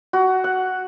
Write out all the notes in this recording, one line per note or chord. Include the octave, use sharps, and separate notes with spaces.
F#4
F#5